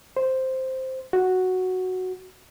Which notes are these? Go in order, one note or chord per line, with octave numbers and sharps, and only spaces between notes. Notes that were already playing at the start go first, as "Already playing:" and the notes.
C5
F#4